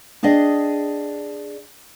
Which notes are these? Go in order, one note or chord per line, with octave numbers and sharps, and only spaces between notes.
D4 G#4 D5 D#5 G5